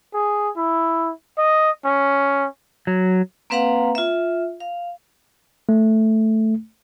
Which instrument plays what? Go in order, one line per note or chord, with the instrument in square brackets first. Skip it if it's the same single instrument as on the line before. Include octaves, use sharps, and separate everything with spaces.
[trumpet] G#4
E4
D#5
C#4
[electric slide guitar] F#3
[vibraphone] A#3 C4 B4 F5 F#5 A#5
F4 E5
F5
[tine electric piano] A3